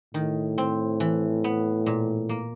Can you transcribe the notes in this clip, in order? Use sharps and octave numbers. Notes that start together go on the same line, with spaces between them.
A2 D#3
C4
E3
B3
A#2
A#3